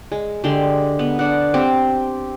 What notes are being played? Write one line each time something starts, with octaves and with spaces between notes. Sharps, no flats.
G#3
D3 G#3 G4 C6
B3
D4 F#5
C4 G4